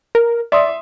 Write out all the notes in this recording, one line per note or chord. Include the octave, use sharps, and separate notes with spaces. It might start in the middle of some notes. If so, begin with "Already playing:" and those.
A#4
D5 E5 C6 D#6